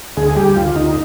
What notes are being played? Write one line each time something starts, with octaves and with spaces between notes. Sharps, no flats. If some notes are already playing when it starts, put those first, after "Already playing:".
D2 G#4
G3 G4
D2 F4
D2 D#4